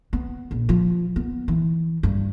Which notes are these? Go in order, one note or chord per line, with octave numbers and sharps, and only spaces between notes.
B3
A#1
F3
B3
E3
G2